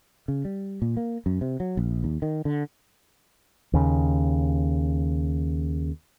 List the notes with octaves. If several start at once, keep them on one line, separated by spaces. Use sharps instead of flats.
C#3
G3
A#2
A#3
F#2
C3
F#3
A#1
D#2
D#3
D3
D#2 C#3